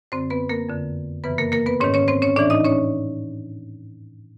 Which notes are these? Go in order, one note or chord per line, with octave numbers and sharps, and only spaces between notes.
F#2 D3 C4 C5
B3 B4
A#3 A#4
F2 D3
F#2 C#3 E3 B3 B4
A#3 A#4
A#3 A#4
B3 B4
G#2 D#3 C#4 C#5
C#4 C#5
C4 C5
C#4 C#5
A2 E3 D4 D5
D#4 D#5
C#4 C#5